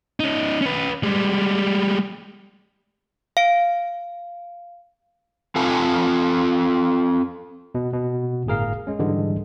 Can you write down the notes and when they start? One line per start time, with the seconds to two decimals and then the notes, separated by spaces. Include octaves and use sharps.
0.20 C#4 D#4
0.62 C#4 B4
1.03 G3 G#3
3.37 F5 D7
5.56 C4 F4 A4 G#5 A5
7.75 B2
7.93 B2
8.46 G1 A2 G#4 A#4 F5
8.87 G#3 C#4
8.99 G#2 D3 E3 G3 G#3